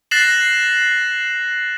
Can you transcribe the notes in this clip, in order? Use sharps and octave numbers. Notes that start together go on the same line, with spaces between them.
F#6 A6 A#6 C7 E7 F#7